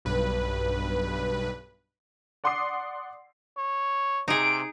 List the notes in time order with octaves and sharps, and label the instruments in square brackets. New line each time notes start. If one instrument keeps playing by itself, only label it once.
[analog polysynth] B1 G2 B4
[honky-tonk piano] D5 F#5 C6 D6 D#6 C7
[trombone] C#5
[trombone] C3 [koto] D#4 G#4 [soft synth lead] D7